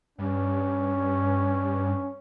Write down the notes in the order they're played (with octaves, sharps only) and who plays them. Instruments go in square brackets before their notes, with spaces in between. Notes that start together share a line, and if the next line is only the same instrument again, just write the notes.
[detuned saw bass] G2 [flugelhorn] C#4